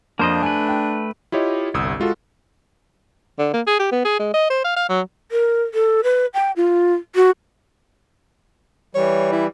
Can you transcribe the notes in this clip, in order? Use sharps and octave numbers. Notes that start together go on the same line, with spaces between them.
F2 A#3 D4 C5 D#5
A3 B4 G#5
G5
E4 F4 G4 C#5 D#5
G1 C2 D#6 E6
G#3 F4 F#4 A4
D3
A#3
G#4
G4
B3
G#4
G#3
D#5
C5
F5
F5
F#3
A#4
A4
B4
G5
F4
F#4
E3 G3 C#5
E4